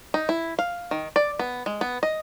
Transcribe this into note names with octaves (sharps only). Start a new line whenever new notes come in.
D#4
E4
F5
D#3
D5
B3
G#3
B3
D#5